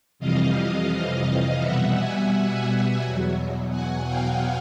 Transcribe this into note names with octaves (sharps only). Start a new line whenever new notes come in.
F2 C3 E3 G3 D#5 F5
B2 G3 E5 F#5
F#5 G#5
E2 B2 F#3
F#5 G#5
F5 G5